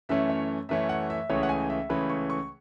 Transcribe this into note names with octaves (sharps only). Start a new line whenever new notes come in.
F#2 E3 A3 C#4 E5
C#5
F#2 E3 A3 C#4 E5
F#5
E5
C#2 C#3 E3 A3 C#4 C#5
F#5
G#5
E5
C#2 C#3 E3 A3 C#4 B5
C#6
C#6